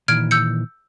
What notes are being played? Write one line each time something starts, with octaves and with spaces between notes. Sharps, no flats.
A#2 D#3 E3 F6 G#6 D7
E6 G6 C#7